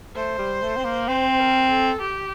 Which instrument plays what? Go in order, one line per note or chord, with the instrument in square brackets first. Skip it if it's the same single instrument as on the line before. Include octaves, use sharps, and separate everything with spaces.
[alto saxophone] A3 [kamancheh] C5
[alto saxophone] G3
A3
C4
A#3
[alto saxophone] C4 [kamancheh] C5
[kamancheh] A#4
A4
G4